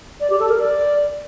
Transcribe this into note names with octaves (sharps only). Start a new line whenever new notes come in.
D5
G4
A4
A#4
D5